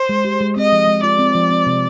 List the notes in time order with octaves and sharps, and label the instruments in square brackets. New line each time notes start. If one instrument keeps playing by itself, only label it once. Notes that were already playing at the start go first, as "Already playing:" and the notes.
Already playing: [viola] C5
[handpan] G#3
G4
G#3
[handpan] C4 [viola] D#5
[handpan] F3
G#3
[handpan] F4 [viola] D5
[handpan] C4
F3
C4
C3